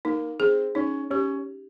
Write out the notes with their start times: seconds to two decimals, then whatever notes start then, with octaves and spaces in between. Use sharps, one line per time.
0.05 A#3 D#4
0.40 C4 G#4
0.75 C#4 D#4
1.10 C#4 G4